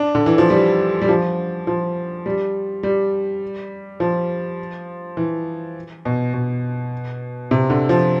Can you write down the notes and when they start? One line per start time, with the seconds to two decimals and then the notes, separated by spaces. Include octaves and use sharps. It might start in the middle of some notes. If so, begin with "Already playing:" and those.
Already playing: D4
0.15 D3
0.26 E3
0.38 F3
0.50 G3
1.02 G3
1.09 F3
1.67 F3
2.26 G3
2.83 G3
4.00 F3
5.17 E3
6.05 B2
6.34 B2
7.51 C3
7.70 D3
7.89 F3